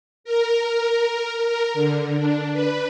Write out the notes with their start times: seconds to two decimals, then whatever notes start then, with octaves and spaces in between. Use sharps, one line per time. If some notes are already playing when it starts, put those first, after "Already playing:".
0.24 A#4
1.43 A#4
1.74 D3
2.16 D4
2.52 B4